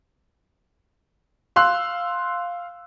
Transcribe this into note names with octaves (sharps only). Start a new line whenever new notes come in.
F5 C6 E6 F#6